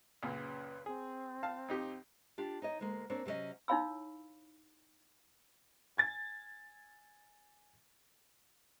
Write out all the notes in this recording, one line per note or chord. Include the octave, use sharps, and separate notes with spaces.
C#2 F#2 A#2 B4
C4 G#4
F5 A5
F2 D#4 G4
D4 F4 G4
D#4 C#5 D#5
D2 G#3 A#3
A#3 C4 D4 C#5
C3 F#3 A3 C#4 D#5
D#4 E4 C#5 F5 B5 E6
G#5 G#6 A6